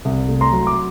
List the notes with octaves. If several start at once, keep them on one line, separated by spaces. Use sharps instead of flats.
C2
A3
A#5 C6
F#3
D6